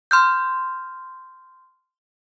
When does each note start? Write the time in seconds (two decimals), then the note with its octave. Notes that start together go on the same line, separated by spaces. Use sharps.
0.11 C6 F6 G6